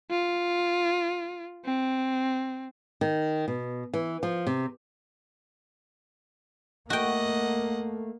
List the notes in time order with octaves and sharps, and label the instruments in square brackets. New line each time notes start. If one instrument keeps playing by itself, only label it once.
[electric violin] F4
C4
[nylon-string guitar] D#3
B2
E3
F3
C3
[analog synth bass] A3 [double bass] A#3 [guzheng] F#4 G5 [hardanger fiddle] D#5 F#5